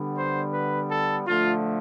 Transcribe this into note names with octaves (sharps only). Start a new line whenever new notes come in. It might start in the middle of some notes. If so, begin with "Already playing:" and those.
Already playing: D3 G3 B3
C5
B4
A4
D3 F3 A3 F4